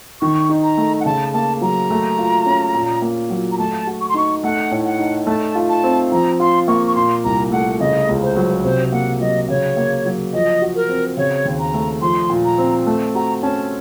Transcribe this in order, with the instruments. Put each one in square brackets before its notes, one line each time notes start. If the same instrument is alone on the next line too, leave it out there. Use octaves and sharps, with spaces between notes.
[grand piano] D#3 [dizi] C#6
[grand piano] D#4
[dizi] A#5
[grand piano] A3
[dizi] F#5
[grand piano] C#3 [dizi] A5
[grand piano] A#3 [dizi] A5
[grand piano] F#3 [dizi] A#5
[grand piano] A3
F4
C#4
A#2
A#3
F#3
[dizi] A#5
[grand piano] A3 [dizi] A5
[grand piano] F#4
[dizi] C#6
C6
[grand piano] D#4 [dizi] C#6
[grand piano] A3 [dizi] F#5
[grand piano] A2
[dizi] F#5
[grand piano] D#4
[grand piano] A3 [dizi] A5
[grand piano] F4
[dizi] A5
[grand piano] C4
[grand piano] F3 [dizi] A#5
[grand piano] F4 [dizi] C6
[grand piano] A#3 [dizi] C#6
[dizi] C#6
[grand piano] A#2 [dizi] C6
[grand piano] C2 [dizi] A#5
[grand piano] A3 [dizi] F#5
[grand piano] C#3 [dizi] D#5
[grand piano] C#2
[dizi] C5
[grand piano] F#3
[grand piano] C3 [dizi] C5
[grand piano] A#3 [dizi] F#5
[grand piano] F#3 [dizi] D#5
[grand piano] C#3 [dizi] C#5
[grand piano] A#3
F#3
[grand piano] F3 [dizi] D#5
[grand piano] F#4
[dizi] A#4
[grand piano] C4
[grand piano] C#3 [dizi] C#5
[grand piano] D#2
[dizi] A#5
[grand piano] A3
[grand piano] F3 [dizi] C6
[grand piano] A#2
[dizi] A#5
[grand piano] C4
[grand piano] A3 [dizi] A5
[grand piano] F#4 [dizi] A#5
[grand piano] C#4 [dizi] A5